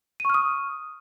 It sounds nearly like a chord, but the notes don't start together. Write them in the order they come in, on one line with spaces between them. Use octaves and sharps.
D#7 C#6 F6 D#6